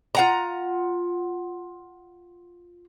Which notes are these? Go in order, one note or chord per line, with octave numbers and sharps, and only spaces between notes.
F4 F#5 A#5